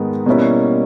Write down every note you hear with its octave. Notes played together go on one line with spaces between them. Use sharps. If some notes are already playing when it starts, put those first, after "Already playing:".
Already playing: G#2 D#3 G#3 B3
B2 G3 A#3 C#4 E4